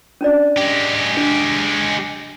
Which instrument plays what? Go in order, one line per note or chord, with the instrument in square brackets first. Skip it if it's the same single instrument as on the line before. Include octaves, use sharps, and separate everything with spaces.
[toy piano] C#4 D4 D5
[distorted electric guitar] G#3 G4
[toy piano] D4